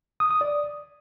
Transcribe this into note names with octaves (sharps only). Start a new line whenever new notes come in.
D#6
D#6
D5